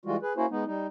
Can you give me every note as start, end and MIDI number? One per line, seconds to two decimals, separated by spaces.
0.05 0.17 52
0.05 0.17 55
0.05 0.17 56
0.05 0.17 65
0.05 0.17 66
0.22 0.33 68
0.22 0.33 71
0.37 0.46 58
0.37 0.46 61
0.37 0.46 64
0.37 0.46 66
0.37 0.46 72
0.51 0.64 56
0.51 0.64 59
0.51 0.64 63
0.66 0.87 55
0.66 0.87 63